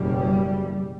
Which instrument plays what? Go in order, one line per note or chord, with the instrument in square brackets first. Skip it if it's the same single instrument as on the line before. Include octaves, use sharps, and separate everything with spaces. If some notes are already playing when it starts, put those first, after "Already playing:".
Already playing: [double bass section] F#1 E2 B2 G3